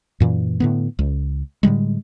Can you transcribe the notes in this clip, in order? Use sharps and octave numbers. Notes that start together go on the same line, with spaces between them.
F#2 A#2 E3
A2 D3 B3
C#2
A2 D3 G3 G#3